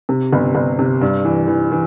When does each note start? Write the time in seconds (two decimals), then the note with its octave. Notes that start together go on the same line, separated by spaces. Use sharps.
0.09 C3
0.33 G1
0.55 G1
0.79 C3
1.01 G2
1.25 E3
1.48 E3
1.72 E3